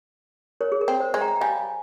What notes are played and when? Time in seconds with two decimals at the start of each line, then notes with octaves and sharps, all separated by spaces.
0.61 A#4 C#5
0.72 G#4
0.81 A#4
0.88 C4
1.00 C5
1.14 G#3
1.21 G5 A#5
1.36 G5
1.41 G3 F5 G#5